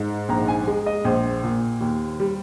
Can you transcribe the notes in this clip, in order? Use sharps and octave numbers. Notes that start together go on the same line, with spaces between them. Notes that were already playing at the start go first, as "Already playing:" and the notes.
Already playing: G#2
A#1 A#5
G#5
G#3
D#5
A#1 C5
A#2
D#2
G3